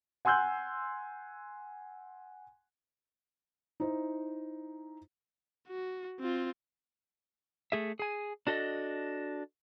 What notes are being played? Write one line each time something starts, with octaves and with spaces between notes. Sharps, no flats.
F#5 G#5 C6 E6 F#6 G6
D#4 E4 C5
F#4
C4 F4
A3 G#4 E5
G#4 G#5
D4 F#4 A4 A#4 D#5